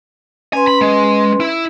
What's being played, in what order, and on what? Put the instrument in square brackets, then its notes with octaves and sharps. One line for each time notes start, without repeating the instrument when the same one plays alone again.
[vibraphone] C#4 B4 C6 [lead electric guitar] G#5
[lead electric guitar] B5
G#3
E4